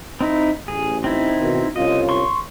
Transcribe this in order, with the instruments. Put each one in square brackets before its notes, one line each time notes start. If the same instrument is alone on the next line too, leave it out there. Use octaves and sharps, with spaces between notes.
[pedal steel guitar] C4 D#4 E4
[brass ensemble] A1 [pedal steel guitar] G#4
[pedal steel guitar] C4 D#4 E4
[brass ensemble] B2 D#3
[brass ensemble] C2 C#4 F4 [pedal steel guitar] D#5
[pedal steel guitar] C6 C#6